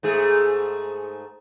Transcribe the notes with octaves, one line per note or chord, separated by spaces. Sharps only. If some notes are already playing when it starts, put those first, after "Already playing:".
G#2 A3 G#4